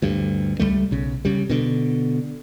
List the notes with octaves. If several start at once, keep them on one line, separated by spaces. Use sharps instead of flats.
D2 G2
C#2 G#2 G3 A3
B1 C#3
C#3 G3
B2 D3